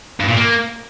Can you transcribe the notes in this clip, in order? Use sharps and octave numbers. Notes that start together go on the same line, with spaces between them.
G2
A#2
A#3